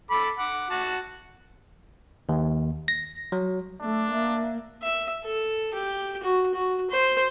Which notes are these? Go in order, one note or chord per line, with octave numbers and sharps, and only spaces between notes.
A4 B5 D6
F#5 D6
F#4 A5
D#2
A#6
F#3
A3 D4
A#3 E5
E5
A4
G4
F#4
F#4
C5